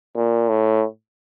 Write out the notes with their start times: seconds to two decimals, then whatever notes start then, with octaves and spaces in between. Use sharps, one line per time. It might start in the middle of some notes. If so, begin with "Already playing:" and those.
0.15 A#2
0.49 A2